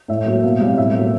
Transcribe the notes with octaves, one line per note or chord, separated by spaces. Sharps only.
A2 E5
F#3 A#3
B2 F5
G3 C4 F5
A2 E5
F#3 A#3